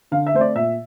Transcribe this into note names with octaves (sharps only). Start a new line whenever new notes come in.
D3 F5
E5
A3 C4 C5 D5
A#2 E5